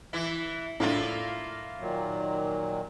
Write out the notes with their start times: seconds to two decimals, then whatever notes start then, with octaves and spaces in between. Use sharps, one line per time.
0.13 E3 E4
0.80 A2 A#3 D4 E4 F4
1.79 A#2 D#3 F#3